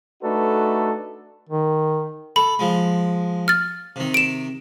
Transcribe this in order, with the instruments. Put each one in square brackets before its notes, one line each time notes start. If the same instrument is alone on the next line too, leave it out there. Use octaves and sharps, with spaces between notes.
[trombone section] A3 D4 D#4 F#4 A4 B4
[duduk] D#3
[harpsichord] A4 [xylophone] B5
[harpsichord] F3 G#3
[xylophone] F6 A6
[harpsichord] C3 D#3
[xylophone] D7 E7